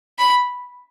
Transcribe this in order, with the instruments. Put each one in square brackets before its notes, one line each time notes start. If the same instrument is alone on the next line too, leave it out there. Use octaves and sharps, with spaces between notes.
[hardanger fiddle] B5